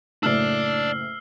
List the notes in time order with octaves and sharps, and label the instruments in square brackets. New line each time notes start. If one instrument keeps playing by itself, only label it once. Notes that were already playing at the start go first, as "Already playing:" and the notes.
[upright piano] F#1 A2 [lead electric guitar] D4 D5 [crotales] E6 F6 C7